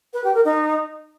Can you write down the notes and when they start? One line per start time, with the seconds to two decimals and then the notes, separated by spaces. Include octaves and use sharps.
0.14 B4
0.24 G4
0.35 A#4
0.45 D#4